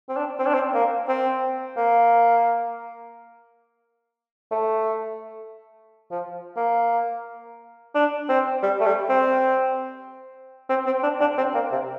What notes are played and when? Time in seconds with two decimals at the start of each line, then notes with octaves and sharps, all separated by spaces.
0.09 C4
0.17 D4
0.39 C4
0.47 D4
0.54 C4
0.74 A#3
1.08 C4
1.77 A#3
4.51 A3
6.11 F3
6.57 A#3
7.95 D4
8.29 C4
8.63 G3
8.80 A3
8.86 G3
9.09 C4
10.70 C4
10.86 C4
11.03 D4
11.21 D4
11.38 C4
11.55 A#3
11.72 C3